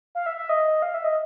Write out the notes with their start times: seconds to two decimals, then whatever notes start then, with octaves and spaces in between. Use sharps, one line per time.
0.15 F5
0.26 E5
0.37 E5
0.49 D#5
0.82 F5
0.94 E5
1.04 D#5